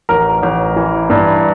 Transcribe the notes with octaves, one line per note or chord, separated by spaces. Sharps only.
A1 A#4
A1
E3
G2